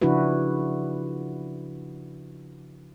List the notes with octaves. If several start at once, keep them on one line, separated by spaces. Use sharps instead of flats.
C#3 F3 D4 E4 F#4 B4